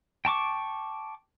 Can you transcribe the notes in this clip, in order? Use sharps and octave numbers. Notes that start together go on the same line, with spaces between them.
G5 A5 C#6 D6